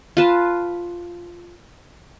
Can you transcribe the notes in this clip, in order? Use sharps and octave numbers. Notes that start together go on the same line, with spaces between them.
F4 B4 A5